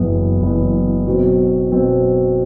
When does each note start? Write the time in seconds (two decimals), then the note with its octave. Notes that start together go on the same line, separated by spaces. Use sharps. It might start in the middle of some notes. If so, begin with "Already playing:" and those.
Already playing: F#1 F#2 E3 B3
0.40 F#1 F#2 E3 B3
1.06 B2 F#3 C4
1.71 B2 F#3 C4